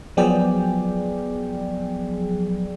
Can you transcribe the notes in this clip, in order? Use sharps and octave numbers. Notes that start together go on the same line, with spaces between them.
F3 F#3 B3 G#4 D5 G5